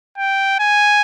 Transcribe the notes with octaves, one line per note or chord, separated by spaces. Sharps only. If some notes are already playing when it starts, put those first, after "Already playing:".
G5
G#5